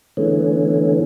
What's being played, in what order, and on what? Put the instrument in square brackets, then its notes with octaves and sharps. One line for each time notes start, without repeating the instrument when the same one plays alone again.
[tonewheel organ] D3 E3 G#3 A3 B3 C#4